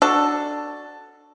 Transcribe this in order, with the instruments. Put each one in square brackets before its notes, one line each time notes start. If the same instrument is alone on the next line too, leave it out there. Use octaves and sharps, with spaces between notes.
[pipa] D4 F#4 A4